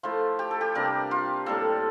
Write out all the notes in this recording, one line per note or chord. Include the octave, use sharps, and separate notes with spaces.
F3 A3 E4 F4
G4
A4
G4
C3 G3 A#3 D4 A#4
F4
A2 G3 A#3 A4